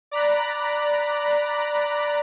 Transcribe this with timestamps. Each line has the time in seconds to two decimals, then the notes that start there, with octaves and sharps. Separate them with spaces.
0.11 D5 A#5 B5 F#6